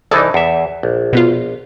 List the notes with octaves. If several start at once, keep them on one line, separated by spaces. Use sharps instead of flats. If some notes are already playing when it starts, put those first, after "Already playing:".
C2 E3 D#4 G#4 A4 D5
E2 E5
A#1
B2 B3 F4